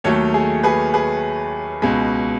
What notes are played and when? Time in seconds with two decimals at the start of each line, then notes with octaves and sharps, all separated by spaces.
0.04 D#2 D#3 F#3 A3 A4 C#5
0.34 G#4
0.63 G#4 B4
0.94 G#4 B4
1.82 C#2 B2 G#3